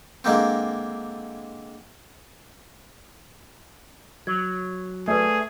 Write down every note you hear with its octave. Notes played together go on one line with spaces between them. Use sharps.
D3 G#3 A#3 C4
F#3 G#6
A3 G#4 B4 D5